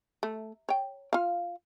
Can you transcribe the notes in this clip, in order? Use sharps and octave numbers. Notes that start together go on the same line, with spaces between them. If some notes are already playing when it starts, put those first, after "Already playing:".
A3
C#5 G5
F4 F5